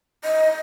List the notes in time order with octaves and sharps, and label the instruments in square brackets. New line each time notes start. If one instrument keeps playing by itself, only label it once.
[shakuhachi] D#5